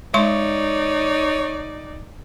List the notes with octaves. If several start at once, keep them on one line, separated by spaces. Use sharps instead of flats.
G#3 D#4 C#5 D5 C6 C#6